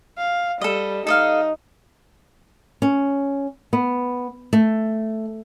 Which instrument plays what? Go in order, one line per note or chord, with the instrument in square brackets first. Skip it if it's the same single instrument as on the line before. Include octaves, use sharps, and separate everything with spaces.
[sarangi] F5
[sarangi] G3 [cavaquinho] A4 D#5
[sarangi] D#4 [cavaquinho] A4 D#5 F5
[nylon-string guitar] C#4
B3
A3